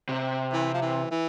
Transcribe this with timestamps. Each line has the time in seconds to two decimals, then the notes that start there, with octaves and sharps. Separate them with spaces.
0.09 C3
0.53 E3
0.74 F3
0.82 E3
1.11 E3